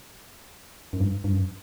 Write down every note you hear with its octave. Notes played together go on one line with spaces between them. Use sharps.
F#2
G2
G2
F#2